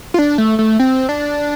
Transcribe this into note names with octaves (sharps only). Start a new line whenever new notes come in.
F4
D4
A3
A3
C4
D4